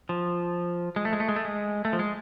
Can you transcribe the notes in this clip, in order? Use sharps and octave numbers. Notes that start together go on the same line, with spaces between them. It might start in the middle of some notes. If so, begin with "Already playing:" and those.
F3
G#3
A3
G#3
A3
G#3
A3
G#3
A3
F3
G#3